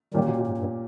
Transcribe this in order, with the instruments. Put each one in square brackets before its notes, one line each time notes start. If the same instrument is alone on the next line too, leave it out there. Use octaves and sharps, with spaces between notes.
[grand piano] A#2 A#3 C#4 G4 [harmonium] D#3 G3
[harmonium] B2 D#3
B2
G#2
G2